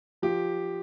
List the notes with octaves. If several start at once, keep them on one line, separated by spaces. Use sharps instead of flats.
F3 G4